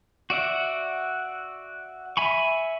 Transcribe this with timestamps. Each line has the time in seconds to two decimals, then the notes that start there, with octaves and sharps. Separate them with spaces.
0.30 F#4 D5 E5 F#5
2.17 E5 G#5 B5 C#6